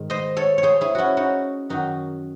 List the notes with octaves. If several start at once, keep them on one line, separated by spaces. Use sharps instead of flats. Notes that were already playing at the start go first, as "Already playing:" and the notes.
Already playing: G#2 D#3
C5 D#5
A4 C#5
C#5
G#4 C5
E4 G#4
C#4 E4 F#4
D#4 F#4
F#2 D#3 D#4 F#4